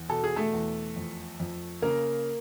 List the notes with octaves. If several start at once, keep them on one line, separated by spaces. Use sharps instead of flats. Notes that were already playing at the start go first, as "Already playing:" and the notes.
Already playing: E2
B2 A4
G#4
A3 A4
E2
F2
F2
C#3 A#3 A#4